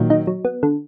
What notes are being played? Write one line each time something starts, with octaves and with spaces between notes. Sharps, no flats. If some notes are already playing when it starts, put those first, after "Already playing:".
Already playing: A#2 D#3 F#3
D#4
F#3
B3
D3